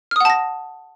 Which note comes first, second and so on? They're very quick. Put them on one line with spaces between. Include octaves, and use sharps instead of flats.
F6 D#6 F#5 A5 A#6